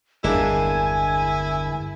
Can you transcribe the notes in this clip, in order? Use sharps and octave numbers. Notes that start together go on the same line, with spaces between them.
G1 E2 G#3 A#3 D4 E4 G#5